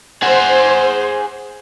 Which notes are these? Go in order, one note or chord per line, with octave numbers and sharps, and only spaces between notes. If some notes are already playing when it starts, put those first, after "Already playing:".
G#4 C5 F#5